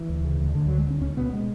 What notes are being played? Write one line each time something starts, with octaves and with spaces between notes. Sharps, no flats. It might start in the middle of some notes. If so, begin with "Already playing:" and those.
Already playing: E3
D2
C#3
D2
D2 D3
D3 F#3
G#3
D2 C#4
C#2 C#4
B2 B3
G#3